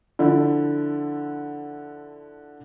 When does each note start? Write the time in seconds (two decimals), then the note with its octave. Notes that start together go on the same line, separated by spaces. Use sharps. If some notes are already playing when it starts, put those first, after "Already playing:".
0.19 D3 F3 E4